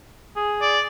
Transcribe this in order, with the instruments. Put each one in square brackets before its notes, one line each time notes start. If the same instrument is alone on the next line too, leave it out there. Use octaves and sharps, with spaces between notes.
[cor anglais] G#4
[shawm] D5